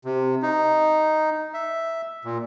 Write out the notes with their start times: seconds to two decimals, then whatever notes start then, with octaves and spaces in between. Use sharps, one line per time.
0.05 C3
0.42 D#4
1.54 E5
2.25 A#2